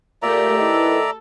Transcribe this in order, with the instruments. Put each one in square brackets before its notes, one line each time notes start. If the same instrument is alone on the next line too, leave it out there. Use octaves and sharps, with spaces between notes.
[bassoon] A#2 [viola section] A3 G4 A#4 [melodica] D5 E5 A#5
[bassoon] D#3 [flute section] E4 B4 [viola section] A4